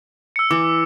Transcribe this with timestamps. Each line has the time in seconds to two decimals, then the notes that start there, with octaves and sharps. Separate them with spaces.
0.36 E6 C#7
0.51 E3 D6